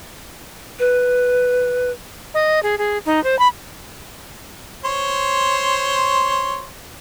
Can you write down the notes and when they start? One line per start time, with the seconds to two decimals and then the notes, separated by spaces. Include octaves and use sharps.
0.79 B4
2.34 D#5
2.63 G#4
2.78 G#4
3.05 D#4
3.24 C5
3.39 B5
4.85 C5 C#5 C6